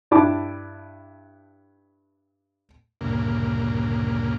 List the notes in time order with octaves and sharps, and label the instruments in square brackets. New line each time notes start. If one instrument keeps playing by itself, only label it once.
[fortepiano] G2 D4 E4 A5 D6
[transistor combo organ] D2 G2 A#2 C#3 A#3